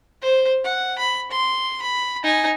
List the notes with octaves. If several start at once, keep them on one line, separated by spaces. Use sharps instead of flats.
C5
F#5
B5
C6
B5
D#4 G#5